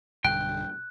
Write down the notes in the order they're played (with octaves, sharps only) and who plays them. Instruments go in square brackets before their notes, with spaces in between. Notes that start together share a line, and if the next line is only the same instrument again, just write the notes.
[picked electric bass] B1 G2 D3 [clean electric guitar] G5 [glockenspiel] F#6